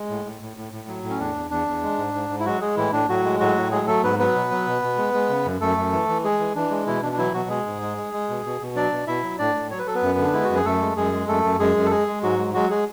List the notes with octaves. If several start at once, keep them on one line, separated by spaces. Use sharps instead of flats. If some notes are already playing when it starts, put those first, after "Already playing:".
Already playing: G#3
A2
A2
A2
A2
A2
F#3
A2
C#4
E2 D4
E2
E2 D4
E2
G#3
G#2
G#2
G#2
E4
F#3 G#3 F#4
G#3 G#4
A2 E3 E4
A2 D4
A2 F#3 F#4
G#3
A2 F#3 F#4
A2
F#3 G#3 G#4
F#3 A3 A4
G#2 B3 B4
F#3 B3 B4
B2
F#3
B2
B2
G#3
G#3
C#3
F#2
F#2 A3 A4
F#2
E3
E3
G#3 G#4
E3
E3 D4
G#3
B2 E3 E4
B2 D4
D4
E3 F#3 E4
B2 F#3 F#4
G#3 G#4
G#2
G#3
G#3
G#3
B2
B2
B2
F#3 D4 D5
B2
B2 E4 E5
F#3
A2 D4 D5
A2
F#3 C#5
B4
F#3 A4
B3 B4
F#2
D3 D4
G#3 E4
F#4
F#2
G#4
F#2 A3 A4
G#3
F#2 G#3 G#4
G#3
F#2 A3 A4
F#2
F#2 G#3 G#4
F#2
A4
G#3 G#4
G#3
G#2 F#3 F#4
G#3
F#3 G#3 F#4
G#3 G#4